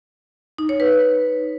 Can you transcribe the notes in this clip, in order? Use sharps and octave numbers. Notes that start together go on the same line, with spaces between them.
D#4
C#5
B4